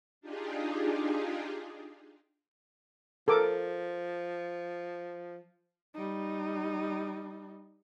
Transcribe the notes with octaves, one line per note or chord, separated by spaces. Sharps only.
D4 D#4 F4 G4 G#4
F3 A4 A#4 D6
G3 D#4